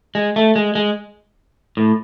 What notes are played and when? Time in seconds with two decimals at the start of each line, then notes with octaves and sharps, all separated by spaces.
0.15 G#3
0.36 A3
0.56 G#3
0.75 G#3
1.77 A2